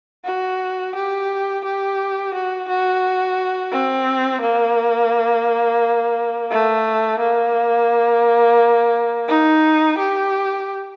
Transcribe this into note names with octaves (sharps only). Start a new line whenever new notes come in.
F#4
G4
G4
F#4
F#4
C4
A#3
A3
A#3
D#4
G4